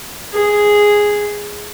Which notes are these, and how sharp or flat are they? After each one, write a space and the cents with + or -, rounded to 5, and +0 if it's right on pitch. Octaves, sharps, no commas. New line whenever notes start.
G#4 -5